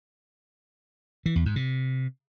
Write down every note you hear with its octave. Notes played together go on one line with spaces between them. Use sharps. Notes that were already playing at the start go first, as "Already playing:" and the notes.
E3
E2
G#2
C3